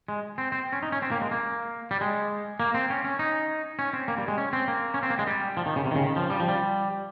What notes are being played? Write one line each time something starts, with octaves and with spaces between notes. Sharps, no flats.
G#3
C4
C4
C#4
D#4
C#4
C4
A#3
G#3
A#3
G3
G#3
A#3
C4
C#4
C#4
D#4
C#4
C4
A#3
G3
G#3
C#4
C4
A#3
C#4
C4
A#3
G#3
G3
F3
D#3
C#3
C3
D#3
C#3
D#3
F3
G3
F3
G3